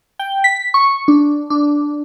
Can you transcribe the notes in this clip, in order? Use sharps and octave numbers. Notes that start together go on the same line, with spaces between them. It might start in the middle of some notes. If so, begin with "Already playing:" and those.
G5
B6
C#6
D4
D4